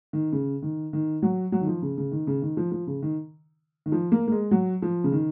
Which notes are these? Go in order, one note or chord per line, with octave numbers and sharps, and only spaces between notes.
D#3
C#3
D#3
D#3
F#3
F#3
D#3
F3
C#3
C#3
D#3
C#3
D#3
F3
F3
C#3
D#3
D#3
F3
A#3
A#3
G#3
F#3
F3
C#3
D#3